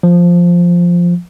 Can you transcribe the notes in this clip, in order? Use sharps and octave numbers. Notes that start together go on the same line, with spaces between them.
F3